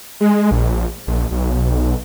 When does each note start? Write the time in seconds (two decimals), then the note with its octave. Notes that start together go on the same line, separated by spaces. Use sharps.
0.21 G#3
0.51 A#1
1.07 A#1
1.31 B1